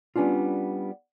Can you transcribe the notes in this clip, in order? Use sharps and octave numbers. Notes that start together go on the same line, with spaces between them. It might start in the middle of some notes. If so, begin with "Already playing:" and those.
G3 B3 C#4 D4 F4